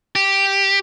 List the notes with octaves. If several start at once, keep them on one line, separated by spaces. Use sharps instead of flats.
G4